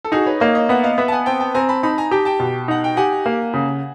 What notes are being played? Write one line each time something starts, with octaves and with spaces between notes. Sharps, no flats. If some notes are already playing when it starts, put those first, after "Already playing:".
A4
D#4 F#4 G#4
B4 C#5
A#3 C#5 D#5
C#5 D#5
B3 E5 F#5
D#5 F5
B3 E5 F#5
A5
F#5 G#5
C4 G5 A5
G5 A5
C4 G#5 A#5
A5 B5
D#4 A5 B5
G#5 A#5
G4 G5 A5
G5 A5
B2
D#4 F#5
G5
G4 F#5 G#5
A#3
C#3